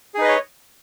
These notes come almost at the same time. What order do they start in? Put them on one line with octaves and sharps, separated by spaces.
G#4 D#4 B4 D#5 C#5